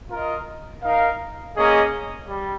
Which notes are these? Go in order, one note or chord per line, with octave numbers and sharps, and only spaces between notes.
F4 A#4 D#5
D#4 A#4 F5
A#3 C#4 G#4 D#5
G3